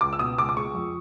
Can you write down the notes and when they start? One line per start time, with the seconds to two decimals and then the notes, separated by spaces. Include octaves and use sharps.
0.01 C#2 D6
0.13 E6
0.19 B2 D#6
0.38 C#2 D6
0.49 D6
0.57 G#3 C#6
0.75 F2